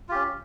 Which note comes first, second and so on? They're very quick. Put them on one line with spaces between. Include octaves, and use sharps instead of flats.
F4 G4 C#4